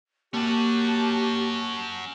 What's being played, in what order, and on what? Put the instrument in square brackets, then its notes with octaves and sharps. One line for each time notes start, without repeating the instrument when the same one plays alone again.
[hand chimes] A#3 [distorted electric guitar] C#4 F#4 [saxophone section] G4 [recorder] A5